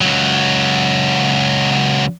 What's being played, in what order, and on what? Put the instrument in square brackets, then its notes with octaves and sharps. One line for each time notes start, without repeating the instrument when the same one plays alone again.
[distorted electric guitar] C#2 F#3